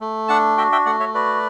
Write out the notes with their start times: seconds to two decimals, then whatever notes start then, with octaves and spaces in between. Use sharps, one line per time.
0.01 A3
0.28 D4 F#5 A5
0.57 F#4 E5 G5
0.72 E5 G5
0.86 A3 D5 F#5
1.00 C#5 E5
1.14 F#4 B4 D5